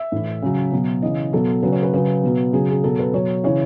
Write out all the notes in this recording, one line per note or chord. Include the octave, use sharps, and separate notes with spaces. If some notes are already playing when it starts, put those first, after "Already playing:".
Already playing: E5
A2 E3
C#3 F#3
B2 F#3
C#3 E3 D#5
B2 F#3 A4
C#3 F#3 B4
C#5
B4
C#3 F#3 B4
B2 F#3
C#3 F#3 G#4
G#4
B2 F#3 A4
B4
B2 F#3 C#5
C#3 E3 C#5